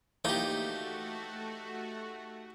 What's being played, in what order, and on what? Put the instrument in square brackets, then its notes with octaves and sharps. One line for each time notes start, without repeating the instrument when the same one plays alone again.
[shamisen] E3 F3 A#3 [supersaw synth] A3 F#4 [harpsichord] D#4 G4